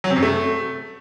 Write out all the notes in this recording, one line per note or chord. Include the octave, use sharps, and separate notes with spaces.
F#3
C3
F#2
A3